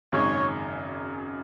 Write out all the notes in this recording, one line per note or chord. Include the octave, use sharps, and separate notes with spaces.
G#1 F#2 C#3 G#3 D#4 C#5